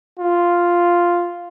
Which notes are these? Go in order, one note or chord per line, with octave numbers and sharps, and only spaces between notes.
F4